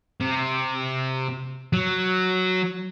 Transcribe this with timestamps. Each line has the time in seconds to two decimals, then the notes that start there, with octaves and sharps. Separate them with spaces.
0.21 C3
1.73 F#3